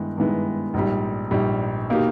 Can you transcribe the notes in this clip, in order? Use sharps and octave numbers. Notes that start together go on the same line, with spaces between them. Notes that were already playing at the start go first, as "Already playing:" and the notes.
Already playing: G2 D#3 G#3 B3 E4
G2 D#3 G#3 B3 E4
A#1 G#2 G3
A#1 G#2 G3
B2 A#3 D#4 G4